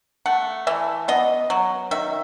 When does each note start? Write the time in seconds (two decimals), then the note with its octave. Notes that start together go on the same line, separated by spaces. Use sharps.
0.26 A3 F#5
0.67 E3 E5
1.08 B3 D#5
1.50 F#3
1.91 D#3 E5